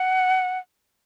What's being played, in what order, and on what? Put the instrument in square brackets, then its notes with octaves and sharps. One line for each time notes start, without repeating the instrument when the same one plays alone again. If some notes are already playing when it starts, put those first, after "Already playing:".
Already playing: [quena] F#5